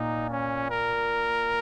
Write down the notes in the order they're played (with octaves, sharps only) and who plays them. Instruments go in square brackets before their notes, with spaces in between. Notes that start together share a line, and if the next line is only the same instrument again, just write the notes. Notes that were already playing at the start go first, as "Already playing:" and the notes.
Already playing: [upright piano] A#2 [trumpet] D#4
[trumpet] C#4
A#4